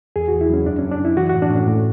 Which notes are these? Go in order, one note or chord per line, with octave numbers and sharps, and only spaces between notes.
E2 G#4
F#4
E2
E4
F#3 C#4
F#2 D4
C#4
F#3
D4
F#2 E4
E3 F#4
F#4
A2
D4
A2 C#4
A2